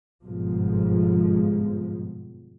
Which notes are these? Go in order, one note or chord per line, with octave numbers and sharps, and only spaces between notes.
G1 F2 G#2 B2 F3 G#3